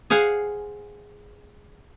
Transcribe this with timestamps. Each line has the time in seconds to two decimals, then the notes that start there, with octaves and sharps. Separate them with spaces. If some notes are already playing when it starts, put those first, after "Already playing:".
0.10 G#4 C5 F5 F#5 G#5